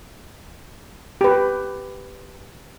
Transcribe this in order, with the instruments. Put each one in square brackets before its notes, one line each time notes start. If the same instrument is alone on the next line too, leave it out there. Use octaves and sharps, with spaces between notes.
[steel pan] G4 B4